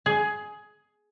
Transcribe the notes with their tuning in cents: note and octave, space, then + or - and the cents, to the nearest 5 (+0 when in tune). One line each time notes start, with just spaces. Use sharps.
G#4 +15